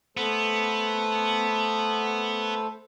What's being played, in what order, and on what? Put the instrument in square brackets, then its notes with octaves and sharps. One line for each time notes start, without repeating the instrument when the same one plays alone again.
[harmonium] A3 A4 C5 [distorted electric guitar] B3